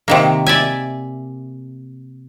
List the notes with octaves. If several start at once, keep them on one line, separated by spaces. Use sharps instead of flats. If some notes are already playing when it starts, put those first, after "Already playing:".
C3 D#3 A#3
D5 E5 G#5